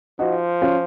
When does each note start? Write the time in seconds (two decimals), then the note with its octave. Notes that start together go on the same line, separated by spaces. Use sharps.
0.19 F3 D#4 F#4
0.62 C#4 F4